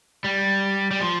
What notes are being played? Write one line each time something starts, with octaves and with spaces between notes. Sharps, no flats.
G3
G3
F3